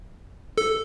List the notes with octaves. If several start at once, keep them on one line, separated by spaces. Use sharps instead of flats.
A4